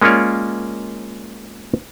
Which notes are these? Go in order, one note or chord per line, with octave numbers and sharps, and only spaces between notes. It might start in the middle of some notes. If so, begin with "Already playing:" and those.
G#3 A#3 C#4 F4 C#5 D5